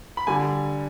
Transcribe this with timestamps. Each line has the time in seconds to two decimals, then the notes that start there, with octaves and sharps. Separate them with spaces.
0.17 B5
0.27 D3 G3 G#5